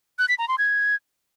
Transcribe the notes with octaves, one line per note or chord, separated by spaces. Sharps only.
F#6
B6
A#5
C6
G#6